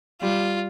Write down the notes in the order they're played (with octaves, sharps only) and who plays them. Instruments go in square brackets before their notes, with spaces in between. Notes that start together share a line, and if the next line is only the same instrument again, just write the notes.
[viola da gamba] G3 [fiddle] F4